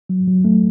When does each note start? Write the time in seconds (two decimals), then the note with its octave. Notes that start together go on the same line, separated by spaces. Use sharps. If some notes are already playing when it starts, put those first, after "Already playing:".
0.09 F#3
0.27 F#3
0.45 A3